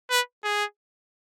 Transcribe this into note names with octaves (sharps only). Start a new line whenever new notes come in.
B4
G#4